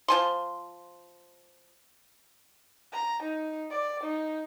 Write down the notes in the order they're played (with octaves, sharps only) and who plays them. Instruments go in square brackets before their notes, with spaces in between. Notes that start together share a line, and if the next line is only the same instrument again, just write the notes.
[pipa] F3 G#5 C6
[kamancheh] A#5
D#4
D5
D#4